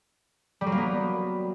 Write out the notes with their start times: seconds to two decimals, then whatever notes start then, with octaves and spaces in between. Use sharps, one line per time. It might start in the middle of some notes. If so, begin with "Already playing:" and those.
0.61 G3
0.67 F#3
0.72 A#3
0.78 B3